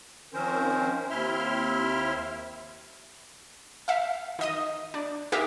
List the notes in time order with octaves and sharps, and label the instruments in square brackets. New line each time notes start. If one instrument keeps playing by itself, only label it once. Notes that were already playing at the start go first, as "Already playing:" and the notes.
[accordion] D#3 F3 C4 C#4 A#4 C5
D#2 C4 E4 E5 C6 F6
[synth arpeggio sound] E5 F5
D#3 D#5 D#6
D4
D#4 G4 G#4 A#4 E5 F5